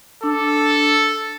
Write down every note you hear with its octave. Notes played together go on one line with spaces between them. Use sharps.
D4 A4